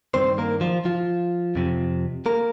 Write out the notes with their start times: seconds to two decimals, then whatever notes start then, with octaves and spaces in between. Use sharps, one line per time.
0.14 G2 D#3 C4 C5
0.38 A#3 A#4
0.61 F3 F4
0.85 F3 F4
1.55 F2 C3 F3
2.26 A#3 A#4